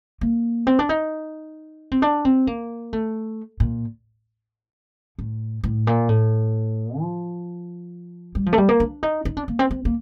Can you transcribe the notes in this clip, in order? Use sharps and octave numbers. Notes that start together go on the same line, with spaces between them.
A#3
C4
D4
D#4
C4
D4
C4
A#3
A3
A#2
A2
A2
A#2
A2
F3
G3
F3
A3
G3
A#3
D4
D#4
D#4
D4
A#3
C4
C4
A#3